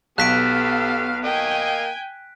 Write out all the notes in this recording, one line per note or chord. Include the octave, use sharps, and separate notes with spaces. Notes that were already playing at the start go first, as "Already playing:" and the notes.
B1 B3 G4 A4 F5 F#6 B6 D7
A#3 D#5 F5 G5 G#5